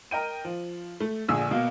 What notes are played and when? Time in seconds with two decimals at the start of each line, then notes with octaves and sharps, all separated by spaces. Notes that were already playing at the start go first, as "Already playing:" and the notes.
0.11 A#4 D#5 G5 D#7
0.45 F3
1.01 A3
1.28 A#1 A#2 D3 G#4 D#6 E6
1.51 B2 A#3